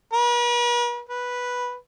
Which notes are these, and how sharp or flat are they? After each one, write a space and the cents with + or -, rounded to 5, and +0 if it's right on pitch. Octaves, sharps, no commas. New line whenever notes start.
B4 -45
B4 -5